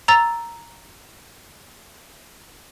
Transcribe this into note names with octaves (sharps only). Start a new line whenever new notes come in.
A#5 E6 A6 F7